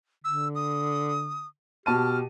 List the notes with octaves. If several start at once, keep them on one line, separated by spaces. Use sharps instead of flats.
D3 E6
D#6
B2 G4 A5 F6 D#7